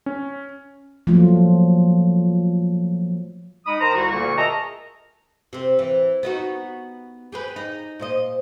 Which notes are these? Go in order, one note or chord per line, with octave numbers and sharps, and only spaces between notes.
C#4
F3 F#3 A3 A#3 F4
G#3 D#4 B5 D#6
D#3 A#4 C5 A#5
C2 F#4
D2 A#2 D3 A#3 C#6
G#4 A#4 D#5 E5 A5 A#5
C3 C4
E3
B3 D#4 F#4
G4 G#4 B4
D#4
A#2 C5 D#5